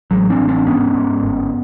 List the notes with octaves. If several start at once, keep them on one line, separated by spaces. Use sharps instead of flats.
A1 F#3 G#3
C4 D4
A1
C4 D4
G#2 B3 C#4
G#2
G1